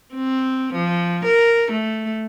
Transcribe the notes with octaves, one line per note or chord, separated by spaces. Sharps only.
C4
F3
A#4
A3